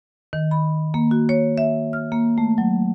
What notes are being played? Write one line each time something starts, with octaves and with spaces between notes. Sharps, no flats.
D#3
B5
A#3
F#4
C#5
E5
F6
A#3
A3
F#3